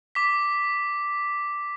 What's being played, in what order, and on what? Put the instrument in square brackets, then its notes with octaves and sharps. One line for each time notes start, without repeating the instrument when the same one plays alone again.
[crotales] D6 B6